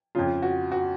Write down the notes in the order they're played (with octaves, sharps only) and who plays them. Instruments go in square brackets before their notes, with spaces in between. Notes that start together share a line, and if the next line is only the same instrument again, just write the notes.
[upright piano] F2 C#3 F4
F#4
F#4